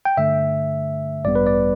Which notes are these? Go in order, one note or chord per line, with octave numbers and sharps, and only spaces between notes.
G5
G2 D3 A3 E5
A1 G2 G3 B3 D5
B4
D5